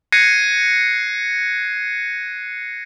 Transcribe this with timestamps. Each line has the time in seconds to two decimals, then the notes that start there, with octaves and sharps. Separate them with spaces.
0.12 F#6 G#6 A#6 C7 C#7 D#7